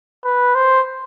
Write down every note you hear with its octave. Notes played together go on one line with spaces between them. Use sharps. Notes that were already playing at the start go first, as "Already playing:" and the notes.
B4
C5